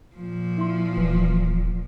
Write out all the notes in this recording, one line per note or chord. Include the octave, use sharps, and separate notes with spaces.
A#2 F3
E4 C6
D#1 E3